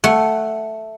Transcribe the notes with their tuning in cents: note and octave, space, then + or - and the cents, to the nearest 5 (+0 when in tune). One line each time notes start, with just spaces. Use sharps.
A3 +0 F#5 +0